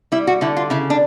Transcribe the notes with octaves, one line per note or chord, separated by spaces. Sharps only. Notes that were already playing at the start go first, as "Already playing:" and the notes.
G3 E4
F#4
D3 E4
F4
C#3 E4
D4